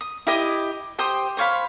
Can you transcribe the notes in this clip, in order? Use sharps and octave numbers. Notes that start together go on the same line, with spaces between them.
D#6
E4 G4 D#5 D#6
G4 C5 G5 D#6
C5 C#5 F5 B5